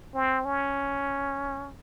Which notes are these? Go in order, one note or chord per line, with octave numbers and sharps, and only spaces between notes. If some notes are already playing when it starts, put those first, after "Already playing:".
C4
C#4